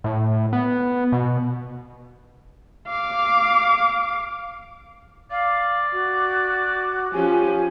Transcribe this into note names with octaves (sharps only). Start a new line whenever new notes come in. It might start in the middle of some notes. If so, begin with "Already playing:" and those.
A2
B3
B2
F5 D6
D5 F5
F#4
F3 C#4 G4 G#5